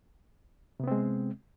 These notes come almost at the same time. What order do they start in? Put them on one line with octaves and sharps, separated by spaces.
C3 B3 C4 G#3